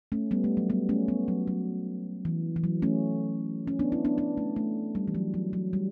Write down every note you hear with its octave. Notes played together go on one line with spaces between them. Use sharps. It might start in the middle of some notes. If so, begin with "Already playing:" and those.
A3 C#4
G3 B3
A3
F#3
G3 B3
A3 C#4
G3 B3
F#3
F#3
E3
E3
F#3
A3 C#4
C#4
B3 D4
C#4 E4
B3 D4
B3 D4
A3 C#4
A3
G3
E3
F#3
F#3
F#3
G3